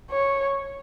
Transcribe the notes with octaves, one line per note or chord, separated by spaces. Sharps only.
C#5